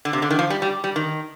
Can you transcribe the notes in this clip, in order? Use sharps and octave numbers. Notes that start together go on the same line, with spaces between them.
D3
C3
D3
D#3
F3
G3
G3
G3
D#3